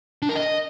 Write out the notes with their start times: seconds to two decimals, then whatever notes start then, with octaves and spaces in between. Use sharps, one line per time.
0.22 D4
0.29 A#4
0.36 D#5